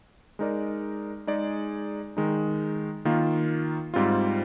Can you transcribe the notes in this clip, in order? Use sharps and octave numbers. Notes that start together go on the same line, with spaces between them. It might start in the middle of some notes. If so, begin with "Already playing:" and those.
G#3 D#4 A#4 D5
G#3 D#4 G#4 D5
D#3 G#3 D#4
D#3 A#3 F4
G#2 G3 C4 F4